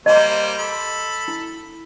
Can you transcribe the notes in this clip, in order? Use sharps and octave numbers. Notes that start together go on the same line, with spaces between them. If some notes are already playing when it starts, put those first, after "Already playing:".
G3 A#3 C5 D#5 A#5
A4 B5
E4